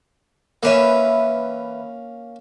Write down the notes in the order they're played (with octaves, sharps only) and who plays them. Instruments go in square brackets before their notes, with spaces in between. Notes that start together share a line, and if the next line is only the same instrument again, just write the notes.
[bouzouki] E3 B4 E5 [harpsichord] A#3 C#4